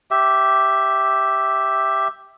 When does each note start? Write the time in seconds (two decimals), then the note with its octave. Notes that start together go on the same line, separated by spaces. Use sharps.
0.11 G4 E5